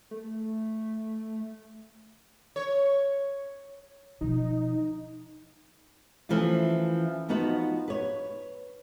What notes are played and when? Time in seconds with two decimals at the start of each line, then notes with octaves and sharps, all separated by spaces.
0.11 A3
2.56 C#5
4.21 B2 F3 D#4
6.29 E3 F3 A3 C#4 F4
7.29 F3 B3 D#4 F4 F#4 B4
7.88 B4 C#5